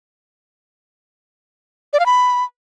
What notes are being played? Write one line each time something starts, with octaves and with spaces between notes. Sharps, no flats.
D5
F5
B5